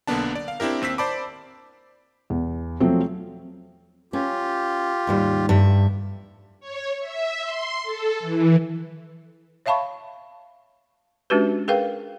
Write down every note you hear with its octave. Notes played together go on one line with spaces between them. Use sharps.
B1 D3 A#3 B3 D4 A5
D5
F5
C4 D4 E4 G4 A#4
D#2 C4 E6 B6
C5 D5 A5 B5 D6
E2
F3 F#3 A3 C4
C#4 F4 G4
D#2 G#2 G3
G2 E5
C#5
E5
C6
A4
E3
C#5 E5 F5 A5 B5 C#6
G#3 C#4 D4 F#4 G4 B4
G#4 A#4 B4 F5 G5